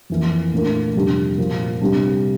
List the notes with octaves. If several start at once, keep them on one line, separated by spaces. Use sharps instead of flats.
F2 E3 A#3
A#2 A3 D4 F4 A#4
F2 C3 G3 D4 G4
A#2 F3 A#3
C3 G3 D4